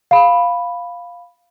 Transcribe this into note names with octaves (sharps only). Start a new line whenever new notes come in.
F5 B5